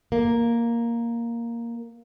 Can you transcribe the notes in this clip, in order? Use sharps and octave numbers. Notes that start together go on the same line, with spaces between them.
A#3